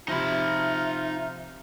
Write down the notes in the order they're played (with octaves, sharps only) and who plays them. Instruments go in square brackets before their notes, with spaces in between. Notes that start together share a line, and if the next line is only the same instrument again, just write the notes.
[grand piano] C3 F3 [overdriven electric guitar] D#4 B5 [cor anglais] F4 [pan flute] E5